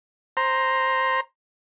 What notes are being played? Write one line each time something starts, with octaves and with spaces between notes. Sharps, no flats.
C5 A#5